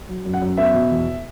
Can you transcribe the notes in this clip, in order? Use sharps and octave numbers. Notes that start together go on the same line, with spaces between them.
F#3
F#2
F#5
F#2
B3 E5
B2
E2